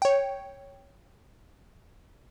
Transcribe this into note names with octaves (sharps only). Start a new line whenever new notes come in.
C#5 G5